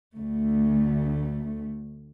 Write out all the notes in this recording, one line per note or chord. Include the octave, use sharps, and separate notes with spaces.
D2 A3